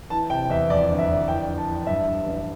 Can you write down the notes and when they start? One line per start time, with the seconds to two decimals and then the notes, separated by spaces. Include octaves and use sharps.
0.10 E3 A5
0.30 C3 G5
0.50 E2 E5
0.70 F2 D5
0.90 G1
0.99 E5
1.08 F2
1.28 E3 G5
1.48 D4
1.58 A5
1.68 E3
1.87 G2 E5
2.06 G2
2.26 A1